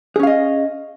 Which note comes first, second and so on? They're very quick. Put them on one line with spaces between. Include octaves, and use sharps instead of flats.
G#4 C#4 F5 D#5